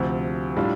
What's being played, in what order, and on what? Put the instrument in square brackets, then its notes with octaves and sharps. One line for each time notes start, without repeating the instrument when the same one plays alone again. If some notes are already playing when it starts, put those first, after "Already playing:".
Already playing: [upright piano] D2 C3 F3
A2 G3 D4 F4